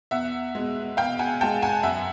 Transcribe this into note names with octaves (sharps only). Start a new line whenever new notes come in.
E2 E5 F#5
B2 G#3
E2 F5 G5
F#5 G#5
B2 G#3 G5 A5
F#5 G#5
F#2 E5 F#5